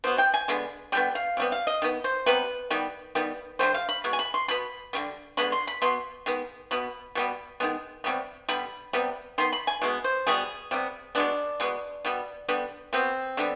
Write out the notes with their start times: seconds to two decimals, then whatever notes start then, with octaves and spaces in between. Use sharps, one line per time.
0.04 B2 B3 C5
0.18 G5
0.34 G#5
0.48 D3 G#3 B3
0.92 D3 G3 B3 G5
1.15 F5
1.37 C3 G3 B3
1.52 F5
1.67 D#5
1.82 D#3 B3
2.04 C5
2.26 C3 G3 B3 B4
2.71 D#3 G3 B3
3.15 D#3 G3 B3
3.59 D3 G3 B3 C5
3.74 F5
3.89 B5
4.04 B2 G#3
4.13 G#5
4.19 B5
4.34 C6
4.48 B2 B3 B5
4.93 D3 G3 B3
5.37 D3 G#3 B3 B5
5.52 C6
5.67 B5
5.82 B2 B3 C6
6.26 D#3 G#3 B3
6.71 B2 B3 B5
7.15 B2 G3 B3
7.60 D#3 G#3 B3
8.04 C3 D#3 G3 B3
8.49 D3 G3 B3 B5
8.93 C3 G3 B3
9.38 D#3 B3 C6
9.53 B5
9.67 G#5
9.82 B2 G#3 B3
10.04 C5
10.27 B2 G3 B3 G#4
10.71 C3 G3 B3
11.15 B2 G#3 B3 D4
11.60 B2 G#3 B3
12.05 B2 G3 B3
12.49 D3 G3 B3
12.93 B2 B3 C4
13.37 D3 G3 B3